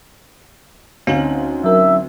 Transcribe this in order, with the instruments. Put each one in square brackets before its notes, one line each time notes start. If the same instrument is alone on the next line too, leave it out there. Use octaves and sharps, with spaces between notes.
[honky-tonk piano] D2 C4 F#7 [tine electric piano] C#4 D#4 [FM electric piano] F5
[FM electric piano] F#3 A#4 [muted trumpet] E5